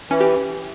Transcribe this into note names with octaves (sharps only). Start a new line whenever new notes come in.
E3 C#4
G4